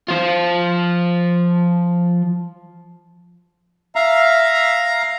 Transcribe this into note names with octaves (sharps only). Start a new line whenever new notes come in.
F3 F4
E5 F5 A#5